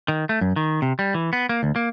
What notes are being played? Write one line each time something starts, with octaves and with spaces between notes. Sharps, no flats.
D#3
A3
F#2
D#3
C3
G3
E3
B3
A#3
D2
A#3